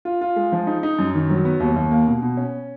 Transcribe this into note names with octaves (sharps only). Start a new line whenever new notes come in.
F4
F4
G#3
F3
D#4
D#4
F#2
D#3
F#3
B3
D#2
D#2
A#3
B2
B2
C#4